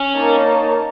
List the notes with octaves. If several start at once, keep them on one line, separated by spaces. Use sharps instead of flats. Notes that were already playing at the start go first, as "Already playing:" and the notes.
Already playing: C#4
A#3 D#4 A#4 C#5 A5